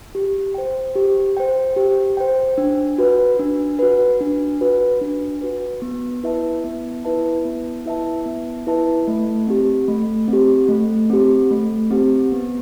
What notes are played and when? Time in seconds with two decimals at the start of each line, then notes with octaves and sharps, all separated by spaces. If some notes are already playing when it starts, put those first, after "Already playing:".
0.15 G4
0.54 C5 G5
0.96 G4
1.37 C5 G5
1.77 G4
2.17 C5 G5
2.58 D4
2.98 F#4 B4
3.40 D4
3.79 F#4 B4
4.21 D4
4.61 F#4 B4
5.02 D4
5.41 F#4 B4
5.82 B3
6.23 E4 B4 E5 A5
6.64 B3
7.05 E4 B4 E5 A5
7.45 B3
7.86 E4 B4 E5 A5
8.26 B3
8.67 E4 B4 E5 A5
9.07 A3
9.47 C4 G4
9.88 A3
10.28 C4 G4
10.69 A3
11.10 C4 G4
11.51 A3
11.90 C4 G4
12.32 B3